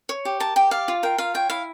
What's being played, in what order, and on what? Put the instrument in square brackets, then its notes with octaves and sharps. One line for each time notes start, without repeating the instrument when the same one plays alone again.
[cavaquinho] C#5
G4
A#4 A5
G4 G5
D5 F5
F4
A#4 G5
F4 F5
C#5 G5
E4 F5